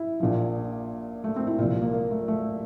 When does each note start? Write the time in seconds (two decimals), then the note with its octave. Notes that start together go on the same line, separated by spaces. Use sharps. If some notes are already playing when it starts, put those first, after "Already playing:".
Already playing: E4
0.20 A#1 A#2 F3
1.24 A3
1.36 C4
1.47 E4
1.58 C2 A#2 F3 F4
1.70 F4
1.82 A#3
1.93 A#3
2.11 A3
2.28 A3